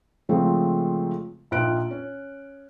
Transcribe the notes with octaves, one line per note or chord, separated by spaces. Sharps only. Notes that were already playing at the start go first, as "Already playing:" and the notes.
C#3 F3 G#3 A3 C4
A#1 D#4 F4 G5 F#6 D7
C#4